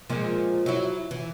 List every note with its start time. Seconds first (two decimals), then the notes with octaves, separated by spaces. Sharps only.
0.10 A#2 F3 G#3
0.66 F#3 E4
1.11 E3